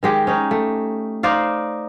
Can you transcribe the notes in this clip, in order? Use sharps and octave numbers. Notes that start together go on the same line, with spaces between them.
D#3 G#3 G4
C#4 D#4
A3
D#4 C5 D5 F5